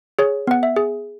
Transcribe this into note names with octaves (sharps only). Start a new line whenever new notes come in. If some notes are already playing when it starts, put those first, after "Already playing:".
G#4 C#5
B3 F#5
E5
G#4